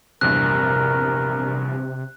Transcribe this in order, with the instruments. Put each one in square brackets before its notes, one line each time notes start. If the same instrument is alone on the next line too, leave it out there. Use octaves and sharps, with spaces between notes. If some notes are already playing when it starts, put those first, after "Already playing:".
[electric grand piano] A#1 E2 G2 [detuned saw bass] C3 [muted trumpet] A#4 [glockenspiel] F#6